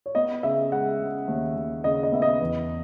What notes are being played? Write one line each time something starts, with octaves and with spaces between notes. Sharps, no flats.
C#5
B3 D#5
C#3 E5
G#3 F#5
C#3
D#2
D#2
C#3 D#5
D#5
B3 E5
D#5
E2